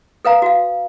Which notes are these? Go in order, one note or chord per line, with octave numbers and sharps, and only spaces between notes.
A4 B4 F5 A#5
F#4 F5